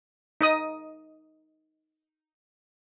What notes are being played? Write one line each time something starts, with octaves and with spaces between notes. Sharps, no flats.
D#4 D#5 D#6